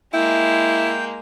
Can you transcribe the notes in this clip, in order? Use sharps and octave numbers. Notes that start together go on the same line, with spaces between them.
G#3 A#3 E4 G5